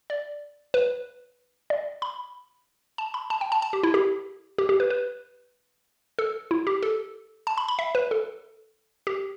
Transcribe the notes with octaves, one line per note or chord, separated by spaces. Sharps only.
D5
B4
D5
B5
A5
B5
A5
G5
A5
A5
G4
E4
G4
G4
G4
B4
B4
A4
E4
G4
A4
A5
B5
B5
E5
B4
A4
G4